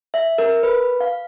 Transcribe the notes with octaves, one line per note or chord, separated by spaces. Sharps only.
E5
A#4
B4
F5